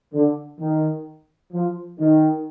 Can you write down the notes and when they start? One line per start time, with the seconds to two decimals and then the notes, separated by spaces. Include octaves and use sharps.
0.13 D3
0.60 D#3
1.53 F3
1.99 D#3